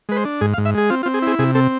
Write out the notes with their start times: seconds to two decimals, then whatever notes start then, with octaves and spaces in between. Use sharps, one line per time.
0.09 G#3 B4
0.16 C5
0.25 D4
0.41 G#2 G#4
0.54 F5
0.58 G#2
0.65 E5
0.74 G#3 G#4
0.90 C4 F4
1.03 F4
1.06 C4
1.14 G#4
1.22 E4
1.27 G#4
1.39 C3 G#4
1.55 C4 A4